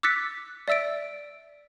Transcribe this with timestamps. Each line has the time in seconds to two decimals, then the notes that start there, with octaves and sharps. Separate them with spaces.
0.03 D6 E6 F#6 A6 B6 C#7
0.68 D5 E5 E6 A6 D7